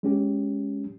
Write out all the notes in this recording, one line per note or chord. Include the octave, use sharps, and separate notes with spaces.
G#3 C#4 G4